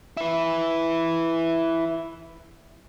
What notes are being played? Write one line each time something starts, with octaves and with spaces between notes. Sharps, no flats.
E4 B4